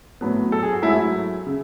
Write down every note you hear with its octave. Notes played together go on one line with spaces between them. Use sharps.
A2 F#3 B3
A4
G#4
F#4
G#2 F#3 A3 E4
C#3